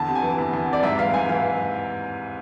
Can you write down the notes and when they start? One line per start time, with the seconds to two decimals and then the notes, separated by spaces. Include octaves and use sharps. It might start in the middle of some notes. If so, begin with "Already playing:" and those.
Already playing: E2 D3 A5
0.08 C3
0.15 G#5
0.23 E3
0.38 E2
0.53 E2
0.68 C3 D5
0.83 G#2 E5
0.98 E3 F5
1.14 G#2 G#5
1.29 E3 F5